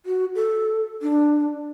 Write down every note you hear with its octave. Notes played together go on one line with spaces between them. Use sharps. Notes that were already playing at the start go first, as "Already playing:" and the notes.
F#4
A4
D4